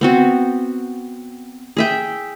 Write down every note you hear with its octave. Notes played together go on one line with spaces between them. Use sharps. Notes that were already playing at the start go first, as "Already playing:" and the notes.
B3 C4 F#4
G#4 E5 G5